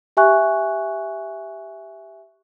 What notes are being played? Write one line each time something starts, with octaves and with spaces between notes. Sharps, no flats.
G4 E5 G#5 C#6 F#6